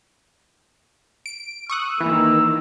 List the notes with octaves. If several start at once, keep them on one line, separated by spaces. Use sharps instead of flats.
D7
C#6 D#6 E6 F#6
D#3 E3 A#3